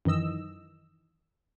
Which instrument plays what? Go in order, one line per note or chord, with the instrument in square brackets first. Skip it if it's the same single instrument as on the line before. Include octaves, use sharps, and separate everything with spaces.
[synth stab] F#2 D#3 E3 D#5 E6